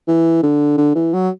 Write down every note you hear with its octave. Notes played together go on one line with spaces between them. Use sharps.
E3
D3
D3
E3
F#3